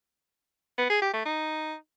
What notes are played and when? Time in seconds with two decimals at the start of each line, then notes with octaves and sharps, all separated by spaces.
0.78 B3
0.90 G#4
1.02 G4
1.14 A3
1.25 D#4